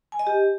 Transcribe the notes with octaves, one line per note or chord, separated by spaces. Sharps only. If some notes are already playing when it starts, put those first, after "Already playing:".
G#5
D#5
G4